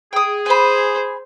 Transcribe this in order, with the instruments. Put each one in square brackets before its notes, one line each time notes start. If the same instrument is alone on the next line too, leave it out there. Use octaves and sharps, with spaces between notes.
[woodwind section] G#4 [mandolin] G5 D#6
[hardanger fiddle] C5 [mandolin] G#5 B5